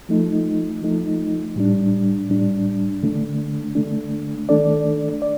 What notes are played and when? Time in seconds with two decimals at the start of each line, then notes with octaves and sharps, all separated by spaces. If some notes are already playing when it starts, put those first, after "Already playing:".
0.09 F3 A3 D#4
0.82 F3 A3 D#4
1.56 A2 G3 D4
2.29 A2 G3 D4
3.03 D3 A3 D4
3.75 D3 A3 D4
4.49 D#3 A3 D4 A4 D5
5.22 D5